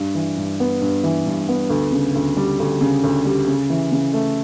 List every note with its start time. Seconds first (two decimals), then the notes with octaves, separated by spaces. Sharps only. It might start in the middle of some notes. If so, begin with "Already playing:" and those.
Already playing: G2
0.15 E3
0.37 G2
0.60 B3
0.81 G2
1.04 E3
1.26 G2
1.48 B3
1.70 D2
1.92 C#3
2.15 D2
2.37 G3
2.59 D2
2.81 C#3
3.04 D2
3.25 G3
3.47 C#3
3.70 E3
3.92 C#3
4.13 A3